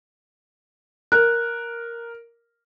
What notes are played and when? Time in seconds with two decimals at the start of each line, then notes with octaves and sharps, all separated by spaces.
1.12 A#4 F#6